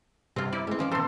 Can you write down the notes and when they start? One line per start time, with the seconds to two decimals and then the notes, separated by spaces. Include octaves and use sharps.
0.36 G2 C3 C4 F4
0.52 E4 D5
0.67 G3 G#3 C4
0.79 D#3 F3 C#4 D5
0.91 B2 E3 A4 C5 C6 E6